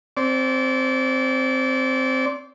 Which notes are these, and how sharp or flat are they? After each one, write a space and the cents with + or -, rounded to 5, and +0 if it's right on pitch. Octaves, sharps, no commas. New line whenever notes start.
C4 +0 D5 -30